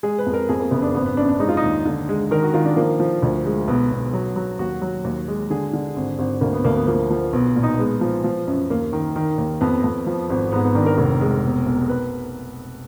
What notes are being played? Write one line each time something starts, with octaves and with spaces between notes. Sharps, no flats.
G#3 G#4
B4
F2
A#4
F2 G#4
A#3
F#1 B3
D4
G#1 B3
B3
F#2 D4
D4
G#3 D#4
F4
D#4
D#2
D3
G#3
D#3 A#4
F#4
D#3 F4
D4
F3 A#3
F3
D2
G#3
B1 B3
B1
F#3
F#3
D#2 F#4
F#3
D#2
G#3
D3 G#4
D3
G#1
G#1
D2 A#3
B3
D2 A#3
B3
F3 A#3
F3
B1 B3
A#2
D#4
G#3 B3
F3
F3
F#2
D#2 A#3
D#3
D#3
D#2
F2 B3
F2
F3
G#1
G#2 B3
B3
D#3 D4
A#4
F1
G#3
B2
B1
B4